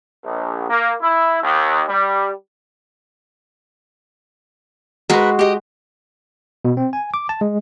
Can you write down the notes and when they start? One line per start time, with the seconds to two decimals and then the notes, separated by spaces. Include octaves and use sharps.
0.24 A#1
0.69 A#3
1.01 E4
1.41 D#2
1.88 G3
5.10 G#3 F#4 A#4 B4
5.39 G4 D#5
6.65 B2
6.77 C4
6.93 G#5
7.14 D6
7.29 A5
7.41 G#3